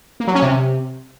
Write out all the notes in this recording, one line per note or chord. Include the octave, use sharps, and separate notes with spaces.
A#3
F#3
C#4
C3